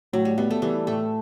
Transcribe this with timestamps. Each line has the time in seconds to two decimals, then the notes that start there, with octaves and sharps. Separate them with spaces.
0.13 A2 F#3
0.25 G3
0.38 G3 B3
0.51 A3
0.62 E3 G3
0.87 A2 A3